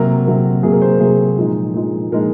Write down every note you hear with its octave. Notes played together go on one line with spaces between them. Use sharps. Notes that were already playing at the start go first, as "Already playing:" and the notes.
Already playing: C3 F#3 A#3 A#4
C3 F#3 A#3
C3 F#3 A#3 G#4
A#4
C5
A#4
C3 F#3 A#3 G#4
A#2 F3 G#3 D#4
A#2 F3 G#3 D#4
A#2 F3 G#3 D#4 A#4